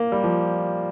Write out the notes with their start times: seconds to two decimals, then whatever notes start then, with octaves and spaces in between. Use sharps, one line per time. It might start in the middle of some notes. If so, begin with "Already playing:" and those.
Already playing: A#3
0.12 G3
0.24 F3